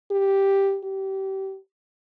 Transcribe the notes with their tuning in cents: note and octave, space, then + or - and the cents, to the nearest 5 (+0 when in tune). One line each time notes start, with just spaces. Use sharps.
G4 +0
G4 -25